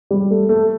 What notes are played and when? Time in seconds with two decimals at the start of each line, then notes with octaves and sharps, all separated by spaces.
0.11 G3
0.30 A3
0.49 A3